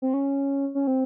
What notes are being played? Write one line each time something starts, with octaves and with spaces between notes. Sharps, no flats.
C4
C#4
C#4
C4